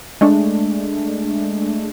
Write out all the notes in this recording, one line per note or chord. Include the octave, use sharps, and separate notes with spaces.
G#3 A3 D4